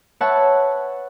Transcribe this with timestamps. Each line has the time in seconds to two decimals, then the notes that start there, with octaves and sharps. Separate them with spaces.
0.21 B4 C#5 E5 F#5 A5